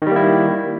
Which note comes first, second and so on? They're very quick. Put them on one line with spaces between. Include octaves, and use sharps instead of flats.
D#3 G3 A#3 E4